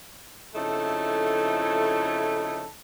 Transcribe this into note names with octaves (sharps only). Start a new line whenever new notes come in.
F2 C#3 A3 D#4 E4 A4